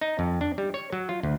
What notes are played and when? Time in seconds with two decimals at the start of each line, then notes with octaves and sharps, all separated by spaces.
0.01 D#4
0.19 F2
0.41 D4
0.58 G3
0.74 C#5
0.93 F#3
1.09 F4
1.23 D2